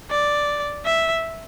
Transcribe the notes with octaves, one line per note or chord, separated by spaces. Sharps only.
D5
E5